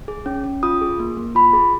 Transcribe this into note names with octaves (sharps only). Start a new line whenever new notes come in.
G#4
C#4
C#4
F4 D#6
G#4
A#3
A#3
F4 B5
G#4